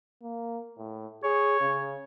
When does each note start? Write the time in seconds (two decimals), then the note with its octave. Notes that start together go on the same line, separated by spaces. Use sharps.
0.22 A#3
0.78 A2
1.23 G#4 C#5
1.61 C#3